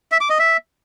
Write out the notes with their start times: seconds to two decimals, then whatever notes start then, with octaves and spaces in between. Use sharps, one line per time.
0.12 E5
0.21 D6
0.30 D#5
0.39 E5